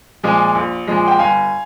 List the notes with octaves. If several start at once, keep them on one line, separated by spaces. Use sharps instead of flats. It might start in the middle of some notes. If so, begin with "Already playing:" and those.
A#2 F3 G#3
A#1
A#2 F3 G#3
G5
G1 F5 G#5